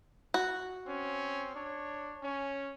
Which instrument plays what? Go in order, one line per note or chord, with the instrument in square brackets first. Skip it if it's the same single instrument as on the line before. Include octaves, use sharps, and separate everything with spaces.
[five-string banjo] F#4
[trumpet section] C4 C#4
D4 C#5
C#4